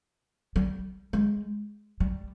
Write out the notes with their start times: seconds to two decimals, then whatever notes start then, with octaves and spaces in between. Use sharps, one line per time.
0.56 G3
1.13 G#3
2.00 G3